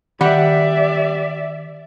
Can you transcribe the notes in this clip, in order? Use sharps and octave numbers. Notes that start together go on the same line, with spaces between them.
D#3 G3 G4 D5 E5 F#5 B5